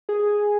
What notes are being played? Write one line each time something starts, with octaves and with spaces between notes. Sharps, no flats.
G#4